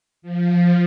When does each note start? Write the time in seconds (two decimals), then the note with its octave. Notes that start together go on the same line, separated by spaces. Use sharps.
0.22 F3